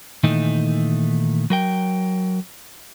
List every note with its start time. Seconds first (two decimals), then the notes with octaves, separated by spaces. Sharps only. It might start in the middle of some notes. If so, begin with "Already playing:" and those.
0.24 A#2 D#3 E3 A3 D#4
1.50 F#3 A#4 G5